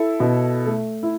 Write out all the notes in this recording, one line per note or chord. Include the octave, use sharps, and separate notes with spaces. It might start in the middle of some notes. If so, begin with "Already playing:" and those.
Already playing: E4 A4
B2
A3
E4